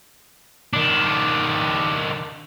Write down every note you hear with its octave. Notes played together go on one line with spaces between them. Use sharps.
D#3 D4